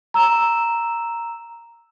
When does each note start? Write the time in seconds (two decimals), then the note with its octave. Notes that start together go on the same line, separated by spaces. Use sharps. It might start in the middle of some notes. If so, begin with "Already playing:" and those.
0.14 A#5 E6 E7